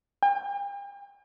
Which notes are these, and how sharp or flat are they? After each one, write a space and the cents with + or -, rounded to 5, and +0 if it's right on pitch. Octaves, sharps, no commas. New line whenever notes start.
G5 +45